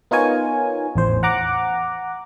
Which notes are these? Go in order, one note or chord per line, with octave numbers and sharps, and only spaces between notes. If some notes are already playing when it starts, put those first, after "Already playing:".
B3 D#4 F4 A#4 C#5 G#5
A1 E2 C5
F#5 A#5 D6 F#6